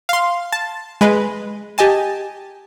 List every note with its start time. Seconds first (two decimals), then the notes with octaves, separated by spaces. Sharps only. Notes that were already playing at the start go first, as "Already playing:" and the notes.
0.09 F5 C6
0.52 A5
1.01 G#3 B4 D#5
1.78 G4 D#5 G#5 A5